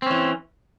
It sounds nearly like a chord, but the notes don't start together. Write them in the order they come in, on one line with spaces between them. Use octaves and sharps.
C4 C#4 E3